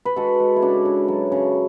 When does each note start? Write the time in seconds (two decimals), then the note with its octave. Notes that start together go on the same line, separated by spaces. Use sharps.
0.05 B4
0.16 G#3 F#4 A4
0.40 G#3
0.56 E4
0.62 C#3 D4 F#4
0.85 C#3
1.08 F#3
1.32 C#3